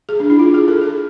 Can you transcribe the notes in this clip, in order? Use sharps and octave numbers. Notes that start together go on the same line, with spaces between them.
G#4
D4
E4
F4
G#4
A4
G#4